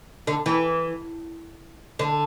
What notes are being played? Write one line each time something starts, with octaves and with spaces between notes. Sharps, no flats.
D3
E3
D3